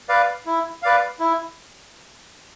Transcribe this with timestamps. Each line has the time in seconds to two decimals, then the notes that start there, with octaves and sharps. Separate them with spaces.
0.09 B4 D5 F5
0.46 E4
0.83 B4 D5 F5
1.20 E4